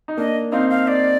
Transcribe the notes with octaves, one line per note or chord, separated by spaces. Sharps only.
D#4
A#3 D4 D#5
C4 D#4 F5
F5
D5